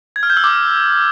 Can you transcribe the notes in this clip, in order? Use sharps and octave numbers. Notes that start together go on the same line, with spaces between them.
G#6
F6
G6
E6
D6